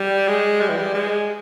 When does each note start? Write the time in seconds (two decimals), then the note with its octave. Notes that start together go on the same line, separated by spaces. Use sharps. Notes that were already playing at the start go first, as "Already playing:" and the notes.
Already playing: G3
0.28 G#3
0.61 G3
0.69 E3
0.77 G3
0.94 G#3